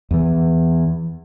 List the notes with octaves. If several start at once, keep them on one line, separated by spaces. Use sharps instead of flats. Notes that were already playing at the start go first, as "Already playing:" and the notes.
E2 E3